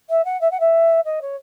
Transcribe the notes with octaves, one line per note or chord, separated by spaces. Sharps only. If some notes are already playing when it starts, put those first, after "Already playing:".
E5
F#5
E5
F#5
E5
D#5
C#5